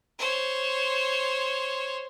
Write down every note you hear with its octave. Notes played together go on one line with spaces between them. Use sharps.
C5 C#5